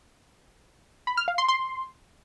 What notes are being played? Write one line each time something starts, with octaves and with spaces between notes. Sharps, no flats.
B5
F6
F5
C6
C6